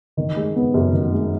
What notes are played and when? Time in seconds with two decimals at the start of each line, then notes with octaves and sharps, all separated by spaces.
0.17 D#3
0.36 G#3
0.56 B3
0.74 F#2
0.93 D#3
1.12 G#3